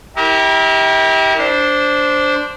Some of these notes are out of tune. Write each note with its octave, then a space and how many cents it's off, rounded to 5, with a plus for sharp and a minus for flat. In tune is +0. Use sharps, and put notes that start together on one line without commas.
E4 -40 G4 +0 A#4 +0
D4 -10 C5 +0